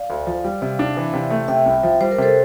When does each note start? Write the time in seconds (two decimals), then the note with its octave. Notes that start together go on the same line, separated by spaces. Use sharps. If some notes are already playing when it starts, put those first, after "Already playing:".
Already playing: D5 F5
0.10 D2
0.27 F3
0.44 G3
0.62 C3
0.79 D4
0.97 E3
1.13 C3
1.31 A3
1.48 C3 E5 G5
1.66 C2
1.83 F3
2.01 G3 C5
2.12 A#4
2.18 C3 A4 C5